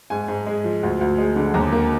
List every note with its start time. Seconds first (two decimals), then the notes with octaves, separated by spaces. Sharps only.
0.10 G#2 G#5
0.28 G#2
0.47 G#3
0.64 F3
0.83 D2
1.01 D2
1.18 G#3
1.36 D3
1.54 D#2 A#5
1.72 A#3